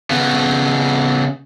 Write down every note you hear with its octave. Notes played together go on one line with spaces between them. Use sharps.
C#3 B3